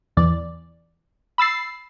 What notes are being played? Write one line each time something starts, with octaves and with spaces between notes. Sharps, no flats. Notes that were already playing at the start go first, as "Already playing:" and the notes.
E2 E3 D5
B5 E6 A6 C7